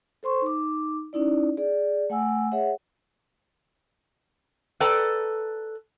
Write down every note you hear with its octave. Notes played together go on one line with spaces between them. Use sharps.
A4 C5 C6 C#6
D#4 D6
C#4 D#4 E4 D5
G#4 D5
A3 F#5 G#5 E6
G#4 C#5 E5 F#5
A4 B4 D5 G5 A5 A#5